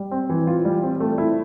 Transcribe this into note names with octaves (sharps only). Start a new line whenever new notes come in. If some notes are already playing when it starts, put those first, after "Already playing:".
Already playing: G3
C4
E3
F4
G3
C4
A3
E4